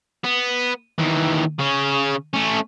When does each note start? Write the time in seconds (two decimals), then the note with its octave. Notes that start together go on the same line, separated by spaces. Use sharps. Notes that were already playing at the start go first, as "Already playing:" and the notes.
0.24 B3
0.99 D#2 E3
1.59 C#3 C#4
2.34 A3 C#4